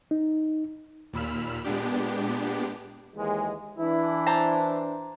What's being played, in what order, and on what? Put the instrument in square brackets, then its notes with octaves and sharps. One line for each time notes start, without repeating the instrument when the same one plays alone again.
[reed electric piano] D#4
[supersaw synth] D#2 A#2 B5 E6 F6
A#2 G#3 B3 D4 G4
[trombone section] D#2 E3 G#3
[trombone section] E3 D4 [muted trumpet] E4
[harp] C5 A5 A#5